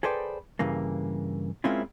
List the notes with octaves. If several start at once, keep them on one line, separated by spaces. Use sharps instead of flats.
G#4 A4 B4 C5 D5 G5
G2 C#3 E3 A#3
G#3 A#3 C4 C#4 E4 F4